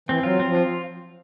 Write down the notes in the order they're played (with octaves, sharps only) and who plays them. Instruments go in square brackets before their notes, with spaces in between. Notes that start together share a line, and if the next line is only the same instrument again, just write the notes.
[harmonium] E3 [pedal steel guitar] C4
[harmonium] F#3 [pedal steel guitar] F4
[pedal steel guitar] C4
[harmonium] F3
[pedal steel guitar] F4